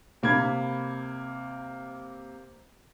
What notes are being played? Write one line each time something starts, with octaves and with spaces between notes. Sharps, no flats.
C3 A#3 B5 G#6